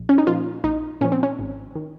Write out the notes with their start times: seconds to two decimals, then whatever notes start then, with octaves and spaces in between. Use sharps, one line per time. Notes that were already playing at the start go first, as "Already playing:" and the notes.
Already playing: A#1
0.09 C#4
0.18 D#4
0.27 A#2 F3 F4
0.64 A#1 D#4
1.01 A#2 F3 C#4
1.12 C4
1.23 C#4
1.39 G#1
1.75 D#3